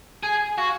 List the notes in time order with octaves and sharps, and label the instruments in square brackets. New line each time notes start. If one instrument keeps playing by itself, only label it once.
[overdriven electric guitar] G#4 [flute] G#5
[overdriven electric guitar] F#4 [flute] F5